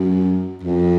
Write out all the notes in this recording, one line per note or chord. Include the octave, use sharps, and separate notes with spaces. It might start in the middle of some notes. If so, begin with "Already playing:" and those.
Already playing: F#2
F2